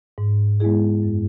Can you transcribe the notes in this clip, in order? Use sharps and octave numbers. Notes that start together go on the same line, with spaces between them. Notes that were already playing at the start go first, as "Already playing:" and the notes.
G#2
G#3 B3 E4 G#4
F#2